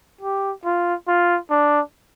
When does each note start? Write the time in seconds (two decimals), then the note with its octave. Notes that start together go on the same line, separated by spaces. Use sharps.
0.21 G4
0.64 F4
1.08 F4
1.50 D4